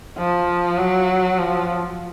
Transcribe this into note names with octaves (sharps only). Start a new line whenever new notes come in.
F3
F#3
F3